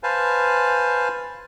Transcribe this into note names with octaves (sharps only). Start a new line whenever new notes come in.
B4 C5 F5 G#5 A5